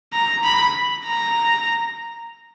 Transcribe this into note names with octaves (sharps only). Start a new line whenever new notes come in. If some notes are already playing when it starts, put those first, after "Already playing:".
A#5
B5
A#5